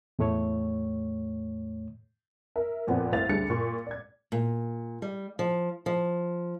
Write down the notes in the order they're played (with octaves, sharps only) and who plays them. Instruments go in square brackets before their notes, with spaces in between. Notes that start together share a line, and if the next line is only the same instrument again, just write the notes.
[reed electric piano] E2 A2 A3 C#5
[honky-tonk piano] A#4 E5
F2 A#2 B3 C4 D5 F#5
C2 A2 C5 F5 A6 F7
D2 D3 G3 G#4 A6 C#7
A#2 C#6
D5 G#6
[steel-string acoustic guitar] A#2
G3
F3
F3